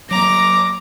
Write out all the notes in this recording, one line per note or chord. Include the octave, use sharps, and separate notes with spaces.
F#3 A#3 A#5 D6